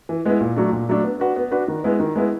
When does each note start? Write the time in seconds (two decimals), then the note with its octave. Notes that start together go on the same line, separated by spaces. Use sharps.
0.09 E3
0.25 G#3 B3 E4
0.41 A#2
0.56 F#3 A3 D4
0.72 A#2
0.89 F#3 A3 D4
1.04 B3
1.20 D4 F#4 B4
1.36 B3
1.51 D4 F#4 B4
1.68 D#3
1.84 G#3 B3 E4
2.00 D#3
2.15 G#3 B3 E4